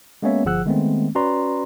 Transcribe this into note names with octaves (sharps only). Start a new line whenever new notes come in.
G#3 A#3 B3 C#4 C#5 E5
G1 F3 G#4 F#5 E6 F#6
D#3 G#3 A3 B3 C4
C#4 F#4 B4 D5 A#5 C6